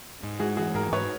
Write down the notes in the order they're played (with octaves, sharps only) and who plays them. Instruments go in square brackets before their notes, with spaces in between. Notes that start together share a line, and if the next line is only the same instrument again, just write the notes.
[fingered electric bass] G#2
[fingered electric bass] G#3 [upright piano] F#4 G#4
[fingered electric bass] E3 [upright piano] F#4 G#4
[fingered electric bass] G#2 [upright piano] G#4 A#4
[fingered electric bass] G#2 [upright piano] B4 C#5